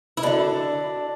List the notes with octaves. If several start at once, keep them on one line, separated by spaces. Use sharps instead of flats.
E4
F#2 D3 D4